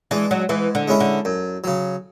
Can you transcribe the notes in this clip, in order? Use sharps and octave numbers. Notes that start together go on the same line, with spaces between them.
E3 G#3 D4
F#3
G#2 E3
D3
G#3 C#4 E4
D3
F#2
C#3 F#3